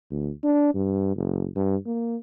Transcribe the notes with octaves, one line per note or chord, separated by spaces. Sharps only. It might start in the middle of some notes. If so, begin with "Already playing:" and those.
D2
D4
G2
F#1
G2
A#3